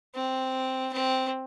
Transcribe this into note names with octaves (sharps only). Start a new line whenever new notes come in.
C4
C4